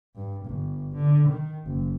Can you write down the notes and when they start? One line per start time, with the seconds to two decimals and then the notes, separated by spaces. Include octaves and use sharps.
0.16 G2
0.46 G1
0.95 D3
1.28 D#3
1.66 F#1